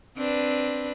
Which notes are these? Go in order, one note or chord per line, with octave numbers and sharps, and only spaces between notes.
C4 D4 B4